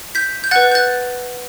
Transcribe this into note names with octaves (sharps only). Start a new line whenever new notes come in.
G6 B6
G6
B4 F#5 F#6 A6
G6
F#6 A6